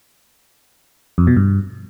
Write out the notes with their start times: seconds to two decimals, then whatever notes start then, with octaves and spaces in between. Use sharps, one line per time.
1.18 F2
1.27 B2
1.36 G2